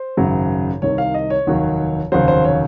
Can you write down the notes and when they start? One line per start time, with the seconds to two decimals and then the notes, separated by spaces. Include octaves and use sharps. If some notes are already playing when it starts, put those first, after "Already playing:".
Already playing: C5
0.17 G#1 F#2 C#3 F#3
0.82 C2 C3 D#3 C#5
0.98 F5
1.14 D#5
1.30 C#5
1.47 F1 D#2 D#3 F#3
2.12 F1 D#2 C#3 F#3 C5
2.28 C5
2.45 C#5